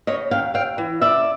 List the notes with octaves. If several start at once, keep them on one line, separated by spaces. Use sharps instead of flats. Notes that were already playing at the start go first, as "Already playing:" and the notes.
C#3 C#5 D#5
D#2 F5 G5
D#2 F5 G5
E3
C#3 D5 E5